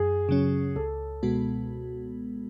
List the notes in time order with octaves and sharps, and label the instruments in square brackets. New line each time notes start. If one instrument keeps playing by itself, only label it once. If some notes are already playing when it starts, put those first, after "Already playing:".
Already playing: [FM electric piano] F#2 [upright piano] G#4
[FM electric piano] C#3 F#3 C#4
[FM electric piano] C#2 [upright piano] A4
[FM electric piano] B2 G#3 B3 F#4